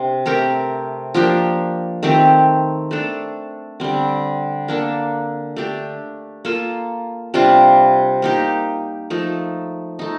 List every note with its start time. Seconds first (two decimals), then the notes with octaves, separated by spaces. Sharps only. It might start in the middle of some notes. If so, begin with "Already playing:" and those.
Already playing: C3 D4
0.26 A3 C4 G4 A#4
1.14 F3 A#3 D4 G4
2.03 D#3 A3 C4 G4
2.91 A3 D4 A4
3.80 D3 G3 C4
4.68 A#3 D4 A4
5.56 A3 D4 G4
6.45 A#3 F4 A4
7.34 C3 G3 D4 F4
8.22 A#3 D#4 G4
9.10 F3 A3 D#4
9.99 A3 D#4